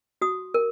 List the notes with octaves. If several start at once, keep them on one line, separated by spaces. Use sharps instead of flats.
F#4 D#6
A#4